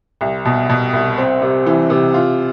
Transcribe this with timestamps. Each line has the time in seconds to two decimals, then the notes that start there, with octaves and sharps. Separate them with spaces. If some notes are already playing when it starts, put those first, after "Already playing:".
0.21 C2
0.45 B2
0.70 B2
0.93 C2
1.18 C4
1.42 C3
1.66 E3
1.90 C3
2.14 F4